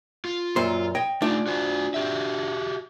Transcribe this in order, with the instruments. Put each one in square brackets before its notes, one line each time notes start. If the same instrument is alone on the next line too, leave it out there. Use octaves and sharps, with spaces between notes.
[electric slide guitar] F4
[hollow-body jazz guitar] F#2 A#2 C5
C#5 D#5 G5
[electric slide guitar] A3 D#4 [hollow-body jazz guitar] D4 F4
[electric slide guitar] F#4 C5 G#5
F#4 G4 E5